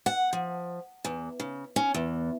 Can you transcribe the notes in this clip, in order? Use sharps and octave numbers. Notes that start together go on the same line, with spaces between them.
F#5
F3
E2
C#3
C#4
E2